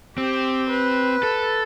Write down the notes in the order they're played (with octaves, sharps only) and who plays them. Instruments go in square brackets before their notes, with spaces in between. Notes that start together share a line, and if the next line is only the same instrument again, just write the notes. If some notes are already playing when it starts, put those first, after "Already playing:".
[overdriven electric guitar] C4 [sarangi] G4
[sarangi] B4
[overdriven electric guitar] A4